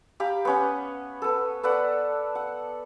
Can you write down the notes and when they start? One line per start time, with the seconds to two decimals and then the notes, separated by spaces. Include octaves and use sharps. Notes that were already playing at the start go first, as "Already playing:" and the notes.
0.20 G4 F5 A#5 B5
0.45 B3 C#4 F#5
1.22 B3 A4
1.63 A4 B4 D5 F#5
2.35 F#5